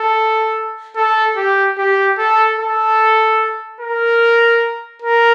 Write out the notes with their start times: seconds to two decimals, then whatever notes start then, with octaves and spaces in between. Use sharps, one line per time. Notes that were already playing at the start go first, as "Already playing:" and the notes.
Already playing: A4
0.96 A4
1.37 G4
1.78 G4
2.18 A4
2.58 A4
3.80 A#4
5.02 A#4